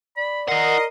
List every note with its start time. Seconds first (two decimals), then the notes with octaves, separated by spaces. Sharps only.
0.17 D5 B5
0.48 E4 A#4 D#5 F#5 C6